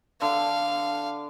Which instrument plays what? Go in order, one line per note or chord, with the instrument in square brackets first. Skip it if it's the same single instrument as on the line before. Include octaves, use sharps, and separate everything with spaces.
[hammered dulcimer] D3 [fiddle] F5